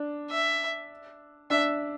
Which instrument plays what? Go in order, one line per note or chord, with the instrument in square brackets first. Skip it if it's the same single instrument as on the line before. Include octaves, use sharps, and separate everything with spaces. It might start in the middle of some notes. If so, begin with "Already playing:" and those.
Already playing: [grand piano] D4
[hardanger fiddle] E5
[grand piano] D4 [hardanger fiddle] E5